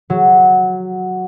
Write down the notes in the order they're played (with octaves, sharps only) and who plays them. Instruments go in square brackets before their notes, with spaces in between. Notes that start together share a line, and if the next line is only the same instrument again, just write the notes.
[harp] F#3